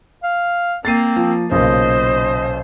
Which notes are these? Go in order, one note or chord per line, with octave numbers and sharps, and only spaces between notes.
F5
A#3 C4 A6 C7 D#7
F3
B1 A#2 C#3 C5 D#5